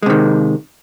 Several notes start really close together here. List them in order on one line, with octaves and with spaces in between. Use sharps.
G#3 C3 D#3